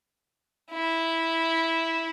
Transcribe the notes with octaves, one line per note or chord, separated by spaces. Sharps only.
E4